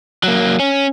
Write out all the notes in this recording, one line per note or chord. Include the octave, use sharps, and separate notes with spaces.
F#3 A#3
C#4